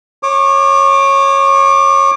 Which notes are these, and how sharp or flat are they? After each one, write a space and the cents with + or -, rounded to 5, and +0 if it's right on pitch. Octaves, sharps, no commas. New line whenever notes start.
C#5 -15 D6 +20